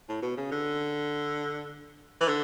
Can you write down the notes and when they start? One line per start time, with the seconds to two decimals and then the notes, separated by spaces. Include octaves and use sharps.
0.09 A2
0.22 B2
0.37 C#3
0.52 D3
2.21 E3
2.29 D3